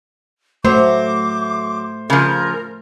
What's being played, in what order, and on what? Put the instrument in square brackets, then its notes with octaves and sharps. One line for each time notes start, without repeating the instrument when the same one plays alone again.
[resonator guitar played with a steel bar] F#3 [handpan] A3 [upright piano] C5 [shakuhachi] D6
[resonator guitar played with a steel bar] C#3 F3 [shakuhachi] A#4